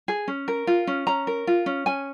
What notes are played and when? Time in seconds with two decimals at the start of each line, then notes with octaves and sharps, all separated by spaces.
0.08 G#4
0.28 C#4
0.48 A#4
0.67 F4
0.87 C#4
1.07 C#4 A#5
1.27 A#4
1.47 F4
1.66 C#4
1.86 C#4 G#5